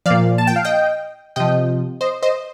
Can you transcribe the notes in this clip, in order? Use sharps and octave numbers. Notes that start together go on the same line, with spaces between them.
A#2 F3 D5 F5
A5
G5
F5
D#5 G5
C3 F3 D#5 G5
C5 D#5
C5 D#5